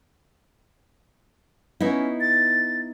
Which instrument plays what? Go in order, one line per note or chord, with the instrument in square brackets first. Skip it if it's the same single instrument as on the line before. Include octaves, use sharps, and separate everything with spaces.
[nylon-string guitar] B3 D#4 E4 [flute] C#4
[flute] A6